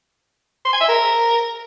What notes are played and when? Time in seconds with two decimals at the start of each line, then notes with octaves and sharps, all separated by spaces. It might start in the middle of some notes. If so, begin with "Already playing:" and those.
0.65 C6
0.73 G#5
0.81 E5
0.89 A#4